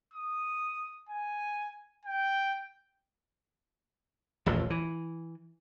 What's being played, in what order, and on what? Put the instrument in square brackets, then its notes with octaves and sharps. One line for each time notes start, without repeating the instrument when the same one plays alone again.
[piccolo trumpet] D#6
G#5
G5
[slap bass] D#1 A1 F2 F3
E3